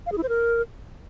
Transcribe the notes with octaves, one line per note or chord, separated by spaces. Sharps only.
F5
G#4
E4
C5
A#4